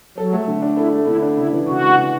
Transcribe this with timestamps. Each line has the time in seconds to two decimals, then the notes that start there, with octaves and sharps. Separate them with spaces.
0.17 F#3 A4
0.32 A3
0.48 D3
0.62 D4
0.77 E4 A4
0.93 A3
1.07 D3 E4
1.22 D4
1.37 C#3 E4
1.53 E3
1.68 C#3 F#4
1.83 G#3
1.97 C#3